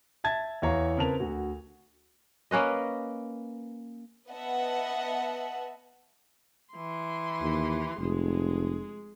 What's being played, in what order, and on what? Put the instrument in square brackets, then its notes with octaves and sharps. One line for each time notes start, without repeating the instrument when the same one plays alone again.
[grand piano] E5 A5 G#6 A6
E2 E4 C#5 F5 A#5
C#3 C4 A#4 B4 A5 F7
D2 F#4
[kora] A#3 C#4 B4 D#5
[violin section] B3 B4 D#5 E5 F#5 A5
[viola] E3 C6
[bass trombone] D#2
[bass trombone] F1 [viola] G#3